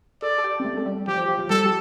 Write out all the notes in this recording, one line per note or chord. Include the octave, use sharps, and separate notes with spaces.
A4 D5
A4
G4
C4
A3
A3
G3
F3 G4
F3
F3
F3
G3 A4
G4